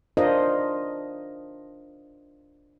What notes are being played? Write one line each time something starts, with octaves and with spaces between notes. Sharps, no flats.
D4 F4 A#4 C5 D#5